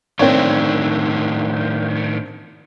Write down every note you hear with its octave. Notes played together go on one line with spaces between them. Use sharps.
A2 D#3 C4 D4 C#5